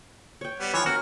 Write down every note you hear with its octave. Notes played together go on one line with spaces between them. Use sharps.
C#5 G5
G3 B3
E3 F3 C#5
C#4 F#4 A#4